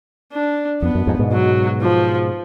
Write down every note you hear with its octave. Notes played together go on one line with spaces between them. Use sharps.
D4
F2 B3
F#2
F2 G#2
G#2 B2
F#3
F3